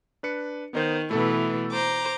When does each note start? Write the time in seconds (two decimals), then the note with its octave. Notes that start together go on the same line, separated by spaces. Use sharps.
0.23 D4 B4 C#7
0.73 D#3 B3 D#4 C5
1.11 B2 E3 A3 A4
1.74 C5 A#5 D6